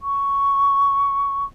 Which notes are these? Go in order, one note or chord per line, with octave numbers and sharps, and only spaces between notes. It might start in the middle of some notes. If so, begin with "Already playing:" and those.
C#6